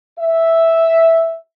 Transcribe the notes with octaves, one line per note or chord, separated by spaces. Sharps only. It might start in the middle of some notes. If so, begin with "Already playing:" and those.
E5